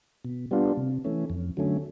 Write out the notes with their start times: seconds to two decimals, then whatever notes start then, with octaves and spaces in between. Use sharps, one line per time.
0.25 B2
0.51 G3 B3 D4 F4
0.77 C3
1.04 E3 A3 C#4
1.30 F2
1.57 D3 F#3 A3 C#4